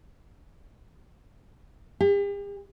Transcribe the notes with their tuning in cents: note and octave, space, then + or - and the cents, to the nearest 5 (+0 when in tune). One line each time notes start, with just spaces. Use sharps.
G4 +45